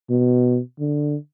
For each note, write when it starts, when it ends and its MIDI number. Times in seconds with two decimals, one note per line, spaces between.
0.10 0.60 47
0.80 1.16 50